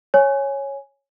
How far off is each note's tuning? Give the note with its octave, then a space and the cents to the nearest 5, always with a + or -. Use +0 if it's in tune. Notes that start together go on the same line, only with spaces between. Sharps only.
C#5 -5 G#5 +0